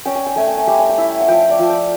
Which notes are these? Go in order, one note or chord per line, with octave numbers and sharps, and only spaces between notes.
C#4 G5
G#5
G5
A3 G#5
G5
G#5
G3 G5
G#5
G5
E4
F#5
F3 G5
D5
F3
G5